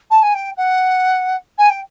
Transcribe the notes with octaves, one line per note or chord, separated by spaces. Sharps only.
A5
G#5
G5
F#5
G#5
G5